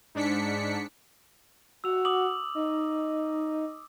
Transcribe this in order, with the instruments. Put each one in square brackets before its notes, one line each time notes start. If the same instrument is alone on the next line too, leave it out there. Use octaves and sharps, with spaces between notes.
[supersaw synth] G#2 D4 B6 C#7
[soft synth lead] F#4 [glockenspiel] E6 F7
[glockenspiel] D6 D#6 F#7
[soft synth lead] D#4